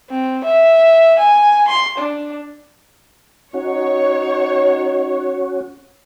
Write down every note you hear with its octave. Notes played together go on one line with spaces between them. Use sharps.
C4
E5
G#5
C6
D4
C#4 D#4 F#4 C#5